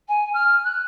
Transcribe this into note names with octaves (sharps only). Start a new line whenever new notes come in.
G#5
F6
F#6